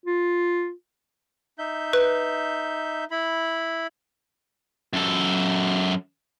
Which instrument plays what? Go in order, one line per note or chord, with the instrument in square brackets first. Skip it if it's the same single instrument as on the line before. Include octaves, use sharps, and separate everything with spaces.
[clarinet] F4
[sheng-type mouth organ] D#4 E5 G6
[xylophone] B4
[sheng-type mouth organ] E4 B5
[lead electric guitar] F#2 A4